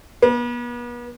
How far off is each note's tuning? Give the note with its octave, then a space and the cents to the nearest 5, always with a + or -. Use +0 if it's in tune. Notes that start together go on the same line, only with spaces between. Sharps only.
B3 -40